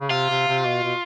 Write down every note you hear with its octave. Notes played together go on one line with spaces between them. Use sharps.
C#3
C3 F4
C3
C3
B2
B2